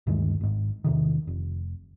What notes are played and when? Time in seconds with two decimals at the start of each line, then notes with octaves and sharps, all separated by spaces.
0.07 D2 G2 D#3 G#3
0.41 G#1 G#2
0.84 E2 C3 D#3
1.27 F1